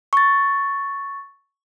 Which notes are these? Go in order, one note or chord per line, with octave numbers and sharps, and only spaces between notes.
C#6 A6